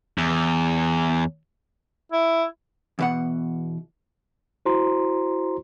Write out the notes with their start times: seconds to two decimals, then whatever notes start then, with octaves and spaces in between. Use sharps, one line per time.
0.18 E2
2.12 E4
2.99 E2 B2 F#5
4.66 E4 F#4 C5 A#5 C6